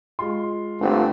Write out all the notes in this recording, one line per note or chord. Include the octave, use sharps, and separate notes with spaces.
G#3 F4 C6
G1 A3 C4